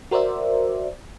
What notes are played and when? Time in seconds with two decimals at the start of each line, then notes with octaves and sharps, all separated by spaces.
0.11 F#4 A#4 C5 D5 E5